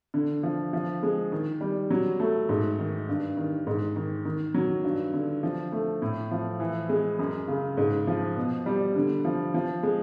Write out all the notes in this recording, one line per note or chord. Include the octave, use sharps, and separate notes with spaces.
D3
F3
F3
G#3
D#3
G3
F#3
A3
G#2
D#3
G2
D#3
G#2
D#3
D#3
F#3
G2
D3
F3
A3
A2
F3
E3
G#3
F#2
C#3
G#2
F3
B2
G3
D3
F3
F3
G#3